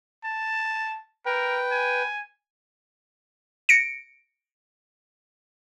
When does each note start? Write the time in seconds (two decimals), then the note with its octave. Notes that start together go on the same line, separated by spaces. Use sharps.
0.24 A5
1.26 A#4 B4 G5
1.71 G#5
3.69 A#6 C#7 D7